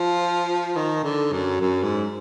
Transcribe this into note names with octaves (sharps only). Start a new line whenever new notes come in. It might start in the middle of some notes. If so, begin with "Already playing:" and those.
Already playing: F3
D#3
D3
F#2
F#2
G#2